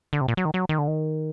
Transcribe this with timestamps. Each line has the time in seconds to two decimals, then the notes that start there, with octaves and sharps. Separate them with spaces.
0.13 D3
0.21 C3
0.28 A#2
0.37 F#3
0.45 D#3
0.54 F#3
0.69 D#3
0.79 D3
0.88 D#3